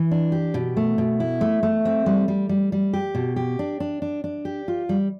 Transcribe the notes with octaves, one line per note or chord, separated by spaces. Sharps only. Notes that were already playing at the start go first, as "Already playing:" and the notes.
Already playing: E3
D4
G4
B2
A3
B2
E4
A3
A3
C4
G3
G3
G3
G3
G4
B2
G4
D4
D4
D4
D4
G4
F4
G3